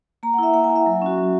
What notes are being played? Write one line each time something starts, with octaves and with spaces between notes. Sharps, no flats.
A#3 A#5
F#5
E4 E5
A#3 F#5
G#5
E4
E5
F#3
C#4 F#4
F#3